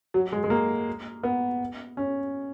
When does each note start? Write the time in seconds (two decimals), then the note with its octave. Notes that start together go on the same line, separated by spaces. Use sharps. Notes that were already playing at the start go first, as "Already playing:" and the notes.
0.14 F#3
0.32 G#3
0.44 G#3
0.50 A#3
1.23 B3
1.97 C#4